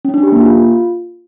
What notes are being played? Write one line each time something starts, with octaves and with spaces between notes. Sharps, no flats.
C#4
D4
G4
A#3
F4